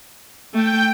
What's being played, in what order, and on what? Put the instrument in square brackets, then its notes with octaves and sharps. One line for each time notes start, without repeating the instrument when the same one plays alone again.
[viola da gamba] A3 [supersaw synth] G5